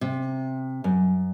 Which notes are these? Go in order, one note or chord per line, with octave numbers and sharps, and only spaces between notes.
C3
F#2